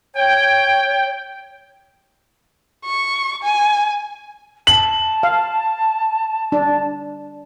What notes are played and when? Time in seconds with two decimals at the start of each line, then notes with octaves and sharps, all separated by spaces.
0.16 C#5 G5
2.85 C#6
3.43 G#5
4.67 A5 F#7
5.23 F5
6.52 D4